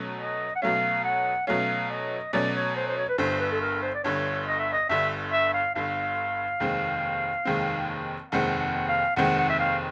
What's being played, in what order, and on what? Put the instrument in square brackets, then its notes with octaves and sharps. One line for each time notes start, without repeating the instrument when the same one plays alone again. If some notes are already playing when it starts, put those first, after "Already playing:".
Already playing: [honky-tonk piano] B2 F#3 A3 C#4
[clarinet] D#5
F#5
[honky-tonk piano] B2 F#3 A3 C#4 [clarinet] F5
[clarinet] F#5
[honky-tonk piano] B2 F#3 A3 C#4 [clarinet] F5
[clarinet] D#5
[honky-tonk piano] B2 F#3 A3 C#4 [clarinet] D5
[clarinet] C#5
C5
C5
C#5
B4
[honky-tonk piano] G1 G2 D3 [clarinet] C5
[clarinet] B4
A4
A#4
C5
D5
[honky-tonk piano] G1 G2 D3 [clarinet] C#5
[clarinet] D#5
E5
D#5
[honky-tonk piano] G1 G2 D3 [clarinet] E5
[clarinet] E5
F5
[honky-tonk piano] G1 G2 D3 [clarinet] F5
[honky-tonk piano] F1 D#2 D#3 G#3 C4
F1 D#2 D#3 G#3 C4
[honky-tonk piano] F1 D#2 D#3 G#3 C4 [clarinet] F#5
[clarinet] F#5
F5
[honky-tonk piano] F1 D#2 D#3 G#3 C4 [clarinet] F#5
[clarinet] F#5
E5
F5